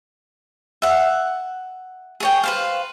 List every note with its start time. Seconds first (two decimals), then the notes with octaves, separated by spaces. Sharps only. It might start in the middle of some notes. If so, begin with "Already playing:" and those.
0.82 E5 F#5
2.20 G#4 C#5 G5
2.43 B4 C5 F5